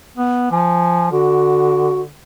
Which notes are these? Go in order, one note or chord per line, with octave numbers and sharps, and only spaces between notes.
B3
F3 G#5
D3 F#4